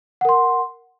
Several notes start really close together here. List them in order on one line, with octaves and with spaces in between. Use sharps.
F#5 A#4 C6